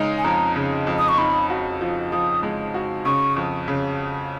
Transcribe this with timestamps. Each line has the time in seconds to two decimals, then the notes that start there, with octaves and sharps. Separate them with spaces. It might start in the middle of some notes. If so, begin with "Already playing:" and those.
Already playing: C#3 G#3 D#4
0.18 G#5
0.24 F2 A#5
0.56 C#3
0.87 F2
0.98 D#6
1.09 C#6
1.18 D#4 B5
1.50 F#4
1.81 F3
2.12 F3 D#6
2.43 G#3
2.74 F#4
3.05 C#3 C#6
3.36 F2
3.68 C#3